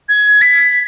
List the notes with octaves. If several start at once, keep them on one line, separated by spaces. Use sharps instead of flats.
G#6
B6